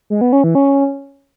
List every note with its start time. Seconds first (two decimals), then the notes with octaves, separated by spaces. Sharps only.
0.10 G#3
0.21 B3
0.33 C#4
0.44 E3
0.55 C#4